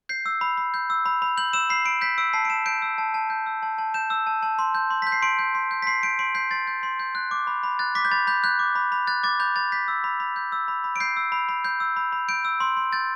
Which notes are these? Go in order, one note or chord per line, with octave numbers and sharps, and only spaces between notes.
G6 C7
E6
B5
B5
G6
E6
B5
B5
G6 F#7
E6 E7
B5 C7
B5 D7
G6 B6
E6 D7
A5 C7
D7
A5 E7
G6 D7
E6
A5
A5
G6
E6
A5
A5
G6 E7
E6
A5
A5
C6
G6
C6
G6 B6
C7
C6 D7
G6
C6
G6
B6
C6 C7
G6 D7
C6 D7
G6 C7
C6 A6
G6
C6
G6
F#6
D6
B5
B5
F#6 A6
D6 B6
G6
B5 A6
B5 G6
F#6 G6
D6
B5
B5
F#6 A6
D6 A6
B5 G6
B5 A6
G6 B6
E6
B5
B5
G6
E6
B5
B5
D7
G6 C7
E6
B5
B5
G6
E6
B5
B5
G6 D7
E6
C6
C6
G6 A6